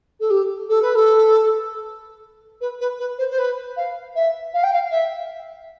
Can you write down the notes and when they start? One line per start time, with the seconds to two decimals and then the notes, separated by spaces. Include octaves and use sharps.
0.20 A4
0.30 G4
0.69 A4
0.82 B4
0.95 A4
2.61 B4
2.80 B4
2.99 B4
3.18 C5
3.30 C5
3.38 B4
3.76 F5
4.15 E5
4.54 F5
4.63 G5
4.73 F5
4.91 E5